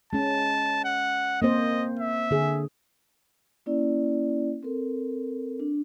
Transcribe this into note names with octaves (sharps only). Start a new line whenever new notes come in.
G#3 C#4 A5
F#5
A#3 C4 C5 D#5
E5
D3 G#4
A#3 C#4 E4 D5
C4 A4 A#4
D4